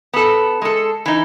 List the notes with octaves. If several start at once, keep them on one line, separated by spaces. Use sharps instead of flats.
B3 A4
G#3 A4
E3 D#4